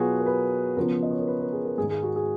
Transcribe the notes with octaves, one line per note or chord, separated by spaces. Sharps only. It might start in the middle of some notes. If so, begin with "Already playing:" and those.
Already playing: B2 F#3 B3 F4 F#4 G#4
A#4
B4
C#3 F3 B3 A#4
D#5
C#5
A#4
B4
A#4
G#4
A#4
G#2 D#3 G#3 G#4
G#4
F#4
G#4